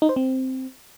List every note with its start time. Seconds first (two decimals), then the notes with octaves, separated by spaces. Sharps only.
0.02 D#4
0.09 C5
0.16 C4